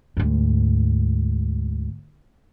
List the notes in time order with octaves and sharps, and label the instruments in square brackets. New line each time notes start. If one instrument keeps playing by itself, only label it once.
[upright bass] D2 G#2